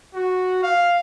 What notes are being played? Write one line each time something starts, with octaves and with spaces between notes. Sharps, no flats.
F#4
F5